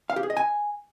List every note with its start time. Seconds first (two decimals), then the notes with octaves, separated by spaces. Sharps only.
0.10 F5
0.16 G4
0.23 G#4
0.30 D#5
0.37 G#5